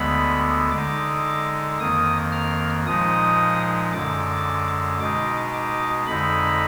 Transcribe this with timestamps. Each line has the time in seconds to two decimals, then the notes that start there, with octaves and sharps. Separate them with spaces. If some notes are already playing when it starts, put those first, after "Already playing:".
Already playing: D2 D3 G#3 B3 B5
0.72 D3 G#3 D#4 D6
1.79 F2 D#3 A#3 D#6
2.32 F6
2.86 A#2 F3 G#3 D#4 D#6
3.93 F#2 D3 G#3 D6
5.00 B2 G#3 D#4 D6
5.54 D6
6.07 F2 D3 G#3 D#4 B5